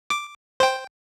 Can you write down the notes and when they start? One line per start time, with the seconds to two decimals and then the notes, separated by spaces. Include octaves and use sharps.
0.10 D6
0.60 C5 G5